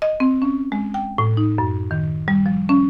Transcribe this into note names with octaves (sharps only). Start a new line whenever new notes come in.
D#5
C4
C#4
G#3
G5
A2
D#4
F#2
D#3
G3
F3
C#4